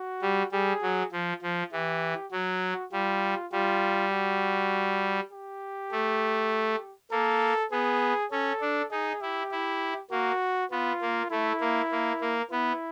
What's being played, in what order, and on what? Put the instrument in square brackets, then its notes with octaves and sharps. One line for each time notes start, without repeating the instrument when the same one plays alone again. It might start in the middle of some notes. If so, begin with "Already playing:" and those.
Already playing: [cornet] F#4
[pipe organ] G3
[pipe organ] G3 [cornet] G#4
[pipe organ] F#3
F3
F3
[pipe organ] E3 [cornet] G4
[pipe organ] F#3 [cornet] F#4
[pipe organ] G3 [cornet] F4
[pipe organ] G3 [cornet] F4
[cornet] F#4
G4
[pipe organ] A3
[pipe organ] A#3 [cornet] A4
[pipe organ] B3 [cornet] G#4
[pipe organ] C#4 [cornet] A4
[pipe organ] D4
[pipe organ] D#4 [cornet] G#4
[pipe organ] E4 [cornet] G4
[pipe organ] E4
[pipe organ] A#3 [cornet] F#4
[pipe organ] B3 [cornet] F4
[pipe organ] A#3
[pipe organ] A3 [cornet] E4
[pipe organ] A#3
A#3
A#3
[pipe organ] B3 [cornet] E4